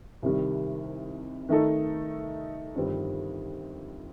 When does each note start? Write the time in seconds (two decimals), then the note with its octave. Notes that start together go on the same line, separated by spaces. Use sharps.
0.22 C2 C3 D#3 G3
1.49 D#3 A3 D#4 A4
2.75 G1 F2 D#3 G3 C4